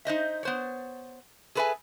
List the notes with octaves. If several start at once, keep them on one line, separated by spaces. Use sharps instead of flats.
D#4 C5 D#5 E5
B3 C5 C#5
G#4 A4 B4 C5 E5 G#5